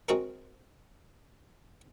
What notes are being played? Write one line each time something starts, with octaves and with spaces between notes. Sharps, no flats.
G#3 C4 F#4 G#4 A#4